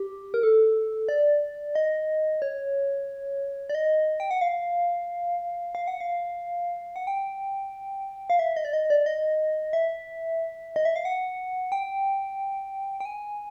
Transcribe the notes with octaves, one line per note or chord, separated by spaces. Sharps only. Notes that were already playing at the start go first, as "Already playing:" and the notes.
Already playing: G4
A#4
A4
D5
D#5
C#5
D5
D#5
G5
F#5
F5
F5
F#5
F5
F#5
G5
F5
E5
D#5
D5
D#5
D5
D#5
E5
D#5
E5
F5
F#5
G5
G5
G#5